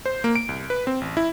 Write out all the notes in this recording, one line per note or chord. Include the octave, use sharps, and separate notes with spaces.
C5
A#3
D7
C2
B4
C4
A1
E4